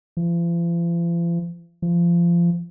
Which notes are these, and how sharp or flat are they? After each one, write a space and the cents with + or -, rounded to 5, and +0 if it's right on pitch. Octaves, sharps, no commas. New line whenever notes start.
F3 -45
F3 -25